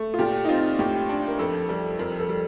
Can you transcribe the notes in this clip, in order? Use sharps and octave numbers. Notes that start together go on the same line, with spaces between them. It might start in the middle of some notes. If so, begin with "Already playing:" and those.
Already playing: A3
F4
A#2 G4
D#4
C4 F4
A2 G4
D4
A#4
F2 A4
G3 A4
F2 A#4
A4
G3